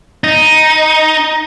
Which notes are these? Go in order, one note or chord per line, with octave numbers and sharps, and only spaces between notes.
D#4